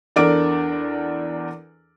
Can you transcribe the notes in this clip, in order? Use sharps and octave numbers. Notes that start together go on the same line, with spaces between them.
E2 D4 A4 A#4 D5 D7